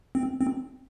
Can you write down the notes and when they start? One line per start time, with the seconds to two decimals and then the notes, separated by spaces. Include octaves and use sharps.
0.15 C4
0.41 C4